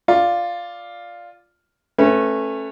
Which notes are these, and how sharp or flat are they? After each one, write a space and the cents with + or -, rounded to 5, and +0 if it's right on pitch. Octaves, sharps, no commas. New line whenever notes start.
F4 +0 D5 +0
A3 +0 C#4 -25 B4 +0